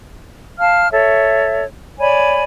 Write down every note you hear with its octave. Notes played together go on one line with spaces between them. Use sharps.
F5 A5 F6
A4 C#5 E5
C#5 D5 G#5 B5